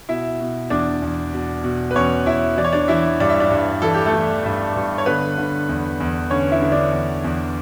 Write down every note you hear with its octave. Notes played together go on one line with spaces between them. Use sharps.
B2 E4 E5
B2
E2 D4 D5
E2
B2
B2
B4
E2 C#4 C#5
E2 E4 E5
E3 D5
C#5
D4 D5
E3 E4 E5
G2 D5
E5
D4 D5
G2
E3 A4
G4
A3 A4
E3
G2
G2
C#5
D3 B3 B4
D3
E2
E2
D3 C#4 C#5
E4 E5
D3
D4 D5
E2
E2